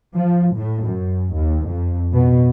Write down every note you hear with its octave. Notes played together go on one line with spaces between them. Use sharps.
F3
A2
F#2
D#2
F2
B2